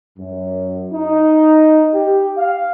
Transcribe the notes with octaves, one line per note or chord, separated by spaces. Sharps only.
F#2
D#4
G4
F5